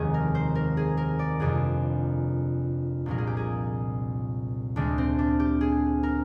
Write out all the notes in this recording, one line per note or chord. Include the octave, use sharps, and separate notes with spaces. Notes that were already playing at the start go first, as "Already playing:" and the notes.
Already playing: F1 D#2 D#3 G#3 G#4
A#4
C5
A#4
G#4
A#4
D5
G1 F2 C3 G#4
C2 A#2 F3 G#3 A#4
G#4
G4
G#4
D2 D3 G#3 D4
C4
D4
G4
G#4
A#4